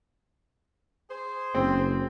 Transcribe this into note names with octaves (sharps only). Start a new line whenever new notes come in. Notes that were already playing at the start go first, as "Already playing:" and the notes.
G#4 C5
F#1 C4